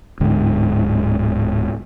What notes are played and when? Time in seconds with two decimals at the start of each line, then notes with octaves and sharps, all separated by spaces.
0.20 D1 G#2 D3